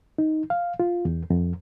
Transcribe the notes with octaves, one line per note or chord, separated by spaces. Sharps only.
D#4
F5
F4
E2
F2